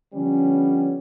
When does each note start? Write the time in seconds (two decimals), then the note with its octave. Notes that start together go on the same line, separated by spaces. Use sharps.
0.14 D3 F3 G3 B3 C#4